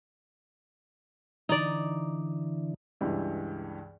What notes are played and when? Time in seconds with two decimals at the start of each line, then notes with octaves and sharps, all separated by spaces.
1.49 D3 E3 D#4 D5
3.01 C#2 G2 E3